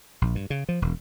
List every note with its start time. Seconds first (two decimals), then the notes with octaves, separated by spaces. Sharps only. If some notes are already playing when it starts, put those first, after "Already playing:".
0.22 A#1
0.35 G2
0.50 C#3
0.69 F3
0.82 E1